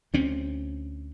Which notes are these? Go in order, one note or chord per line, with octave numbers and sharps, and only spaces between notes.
D2 C4 C#4